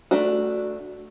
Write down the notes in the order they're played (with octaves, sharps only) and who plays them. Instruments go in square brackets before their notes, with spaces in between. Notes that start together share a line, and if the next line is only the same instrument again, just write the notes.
[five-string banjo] A3 D4 F#4